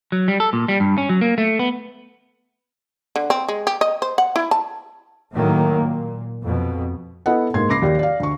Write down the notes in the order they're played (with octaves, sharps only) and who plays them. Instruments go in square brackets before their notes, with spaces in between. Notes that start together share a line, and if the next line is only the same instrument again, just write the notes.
[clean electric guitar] F#3
G3
A4
A#2
G3
G2
C#4
F#3
A#3
A3
B3
[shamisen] D3
C4
G#3
G4
D#5
C5
F#5
E4
A5
[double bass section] A2 D#3 F#3 A#3
A#2
F2 B2
[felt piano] B3 E4 A4 D#5 F#5
G#2 A#3 C6 G#6
C#2 B5 D6 A#6 C7
D#2 G4 D5
D5 F5
D2 C#6